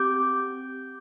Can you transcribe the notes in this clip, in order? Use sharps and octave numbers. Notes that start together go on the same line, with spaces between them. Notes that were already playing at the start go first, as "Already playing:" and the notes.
Already playing: C4 G4 D6 G6